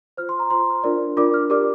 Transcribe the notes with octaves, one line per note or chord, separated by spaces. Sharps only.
F4 C5 F6
C6
A#5
F4 C5 C6
D4 F4 A#4 D5
D4 F4 A#4 D5 D6
F6
G4 A#4 D5 D6